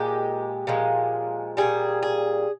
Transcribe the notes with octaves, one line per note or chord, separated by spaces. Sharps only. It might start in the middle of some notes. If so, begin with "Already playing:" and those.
Already playing: A#2 G#3 G4
A#2 F3 G#3
A#2 G3 G#4
G#4